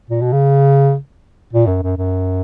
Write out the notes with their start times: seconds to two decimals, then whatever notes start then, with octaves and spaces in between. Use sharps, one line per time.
0.10 A#2
0.22 B2
0.32 C#3
1.53 A#2
1.67 F#2
1.83 F#2
1.97 F#2